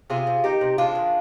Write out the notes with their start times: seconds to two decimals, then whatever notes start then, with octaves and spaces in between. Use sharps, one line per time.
0.10 C3 F4 G#4
0.27 C3
0.44 D#3 D#4 G4
0.61 C3
0.78 G#3 D4 F4
0.95 D#3